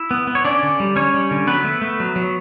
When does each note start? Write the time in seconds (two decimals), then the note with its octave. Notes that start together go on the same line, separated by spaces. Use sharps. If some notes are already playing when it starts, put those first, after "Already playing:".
Already playing: E4
0.11 B3
0.27 B3
0.35 C#5
0.45 C#4 D4 D5
0.63 D3
0.80 G3
0.96 G3 C#4 C#5
1.14 G3
1.31 D3
1.47 F#3 B3 B4
1.64 A3
1.82 A3
2.00 F#3
2.16 F#3